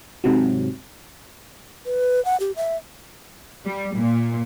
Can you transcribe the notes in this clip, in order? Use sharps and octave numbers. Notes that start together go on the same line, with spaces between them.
G#2 C3 F#3
B4
F#5
G4
E5
G3
A#2